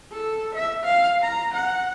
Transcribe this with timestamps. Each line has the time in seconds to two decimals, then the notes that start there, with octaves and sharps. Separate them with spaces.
0.12 A4
0.55 E5
0.84 F5
1.22 A#5
1.54 F#5